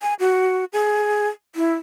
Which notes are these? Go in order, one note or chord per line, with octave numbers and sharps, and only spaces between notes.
G#5
F#4
G#4
E4